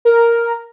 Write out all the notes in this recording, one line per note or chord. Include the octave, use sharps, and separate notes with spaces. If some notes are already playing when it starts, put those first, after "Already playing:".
A#4